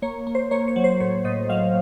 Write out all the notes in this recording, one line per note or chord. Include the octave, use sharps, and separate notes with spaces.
A#3 C#5
A#3
C5
A#3 C#5
C#5
F#3
C5
A2 C#5
A2 D#5
F#3 F5